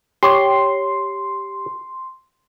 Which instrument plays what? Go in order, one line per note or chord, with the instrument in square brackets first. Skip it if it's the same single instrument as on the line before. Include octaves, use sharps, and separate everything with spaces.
[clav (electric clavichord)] G4 C#5 [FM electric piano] C6